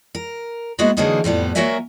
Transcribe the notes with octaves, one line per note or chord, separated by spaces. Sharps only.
A#4
G#3 A#3 B3 E4 F#4 G#4
D3 E3 F#3 A#3 D#4 G#4
F2 A2 G3 B3
F#3 A#3 F#4 A#4 E5 G#5